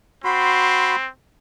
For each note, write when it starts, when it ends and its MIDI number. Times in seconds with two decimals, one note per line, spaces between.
0.24 1.09 60
0.24 0.96 66
0.24 0.96 83
0.24 0.96 84